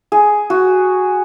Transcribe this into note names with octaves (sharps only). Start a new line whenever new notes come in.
G#4
F#4